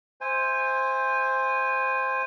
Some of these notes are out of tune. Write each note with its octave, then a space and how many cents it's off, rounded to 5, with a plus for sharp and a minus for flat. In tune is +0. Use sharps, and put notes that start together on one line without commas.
C5 +5 E5 -15 G#5 -15